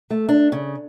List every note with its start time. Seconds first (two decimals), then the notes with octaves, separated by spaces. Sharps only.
0.10 A3
0.29 D4
0.52 C#3